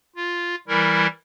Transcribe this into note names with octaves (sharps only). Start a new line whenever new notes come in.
F4
E3 G3 E4 A#4